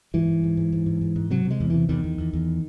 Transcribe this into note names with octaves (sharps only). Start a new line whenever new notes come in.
G#2 E3
G#2
G#2
G#2
G#2
G#2
G#2
G#2
C3 F#3
C3
G#3
E2
C3 E3
E2 D#3
E2
E2
E2